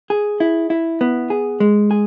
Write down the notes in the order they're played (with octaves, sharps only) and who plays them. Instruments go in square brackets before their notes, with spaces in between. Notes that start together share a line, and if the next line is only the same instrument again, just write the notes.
[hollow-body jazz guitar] G#4
E4
E4
B3
G#4
G#3
G#4